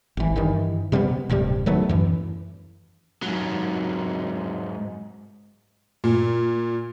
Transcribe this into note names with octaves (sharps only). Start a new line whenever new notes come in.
G#1 E3
G2 D#3 E3
C3 G3 A3 B3
D1 G2 C3 G3
D#3 F#3 A3 B3
F#2 E3
G#2 F#3
A#2